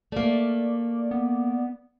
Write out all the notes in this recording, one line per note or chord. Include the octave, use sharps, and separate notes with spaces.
A3 A#3 D5
B3